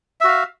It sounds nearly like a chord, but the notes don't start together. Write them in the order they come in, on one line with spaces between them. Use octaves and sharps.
E5 F#4 F5